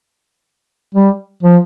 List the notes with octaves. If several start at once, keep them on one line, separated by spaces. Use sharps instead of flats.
G3
F3